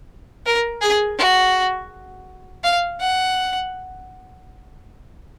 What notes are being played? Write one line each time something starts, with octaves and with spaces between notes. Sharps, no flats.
A#4
G#4
F#4
F5
F#5